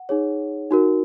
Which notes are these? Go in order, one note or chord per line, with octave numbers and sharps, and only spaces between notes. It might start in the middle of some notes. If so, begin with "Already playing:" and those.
Already playing: F#5
D#4 G#4 C#5
D#4 F#4 A#4